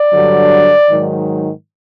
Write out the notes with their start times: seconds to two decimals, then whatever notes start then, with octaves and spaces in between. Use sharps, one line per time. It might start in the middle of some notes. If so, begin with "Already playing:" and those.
Already playing: D5
0.13 G2 D3 F#3
0.89 G#2 D#3 F#3